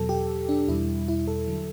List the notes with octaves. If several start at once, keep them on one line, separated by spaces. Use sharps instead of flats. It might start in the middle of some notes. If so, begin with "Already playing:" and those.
Already playing: E2 B2 F#3 A4
G4
D4
E2 B2 G3 E4
E4
A4
D3 F#3